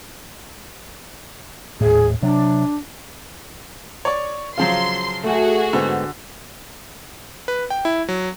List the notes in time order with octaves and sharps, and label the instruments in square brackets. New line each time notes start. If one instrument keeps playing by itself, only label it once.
[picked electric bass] D#1 A2 [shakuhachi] G#4
[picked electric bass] C3 F#3 [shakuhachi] D4
[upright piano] C#5 D5
[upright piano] C#3 F3 F#3 [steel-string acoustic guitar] F5 [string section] C6
[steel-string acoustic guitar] A3 [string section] F#4 G#4
[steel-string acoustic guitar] G#2 B3 C4 [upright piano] D3
[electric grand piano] B4
G5
E4
F#3